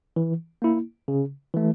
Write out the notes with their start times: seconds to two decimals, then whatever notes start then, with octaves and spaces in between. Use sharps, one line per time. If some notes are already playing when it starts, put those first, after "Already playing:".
0.16 E3
0.62 A#3 E4
1.08 C#3
1.54 E3 A3